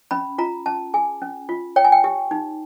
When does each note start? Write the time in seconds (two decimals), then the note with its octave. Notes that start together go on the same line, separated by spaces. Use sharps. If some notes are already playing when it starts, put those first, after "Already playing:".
0.11 C#4 B5
0.38 F4 A#5
0.66 C#4 A5
0.94 G#4 G#5
1.22 C#4
1.49 F4
1.76 C#5 G5
1.85 G#5
1.92 G5
2.04 G4
2.31 D#4